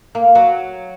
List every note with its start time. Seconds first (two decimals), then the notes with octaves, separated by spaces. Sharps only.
0.15 A#3
0.35 F#3